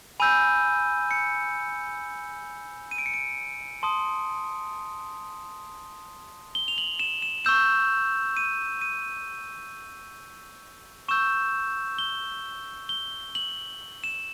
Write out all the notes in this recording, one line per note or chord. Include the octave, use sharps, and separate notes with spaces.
G#5 B5 E6 G6 D#7
C#7
D#7
D7
C#7
D7
A5 C6 D#6
G7
F7
F#7
E7
E7
C#6 E6 G6 E7
D#7
D#7
C#6 E6 G6 E7
G7
G7
F#7
E7